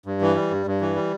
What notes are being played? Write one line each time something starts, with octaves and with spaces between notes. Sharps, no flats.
G2
E3
G3
G2
G2
E3
G3